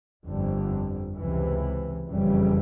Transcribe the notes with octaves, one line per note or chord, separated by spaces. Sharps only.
G1 F2 D3 G3
C#2 C3 E3
F#1 F2 C#3 E3 G3